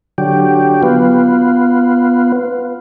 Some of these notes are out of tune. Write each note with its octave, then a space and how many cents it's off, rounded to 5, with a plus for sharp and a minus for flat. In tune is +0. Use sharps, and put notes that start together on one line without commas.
D3 +0 F#3 +0 G4 +0
B3 +0 F4 -5